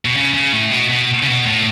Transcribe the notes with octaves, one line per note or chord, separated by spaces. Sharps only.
B2
C#3
C#3
A2
B2
B2
C#3
B2
A2